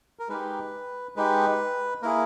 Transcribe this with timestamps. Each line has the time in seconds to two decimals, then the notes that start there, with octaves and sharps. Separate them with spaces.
0.19 A#4
0.29 G#3 D#4 G4 B4
1.16 G#3 D#4 G4 B4
2.02 A#3 E4 G#4 A#4